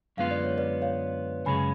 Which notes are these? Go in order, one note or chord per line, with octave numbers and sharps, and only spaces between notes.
F#2 D3 G#3 B3 F4 F5
D5
C#5
B4 D5
C#5 F5
F#2 C#3 G#3 C#4 G#4 G#5 B5